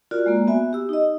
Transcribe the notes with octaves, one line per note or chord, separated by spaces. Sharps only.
F4 F#4 A#4 D5
G#3 A#3
B3 F#4 E5 G#5
G4 E6
D#4 D#5